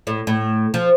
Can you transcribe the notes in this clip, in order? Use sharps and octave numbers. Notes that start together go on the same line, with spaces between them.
A2
A2
F3